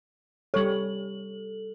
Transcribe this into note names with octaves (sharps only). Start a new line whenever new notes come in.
G3 A4 C#5 F#7